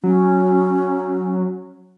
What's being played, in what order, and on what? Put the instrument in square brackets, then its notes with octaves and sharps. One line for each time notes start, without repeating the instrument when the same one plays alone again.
[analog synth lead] F#3 [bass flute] C#4